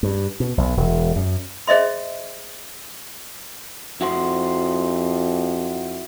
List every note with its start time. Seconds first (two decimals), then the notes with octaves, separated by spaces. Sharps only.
0.03 G2
0.40 B2
0.57 B1
0.77 E1
1.16 F#2
1.67 G#4 C5 D#5 E5 C6
4.01 F2 E4 F#4 C5